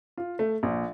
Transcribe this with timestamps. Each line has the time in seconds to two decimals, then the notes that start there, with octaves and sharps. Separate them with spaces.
0.18 F4
0.39 A3
0.63 A#1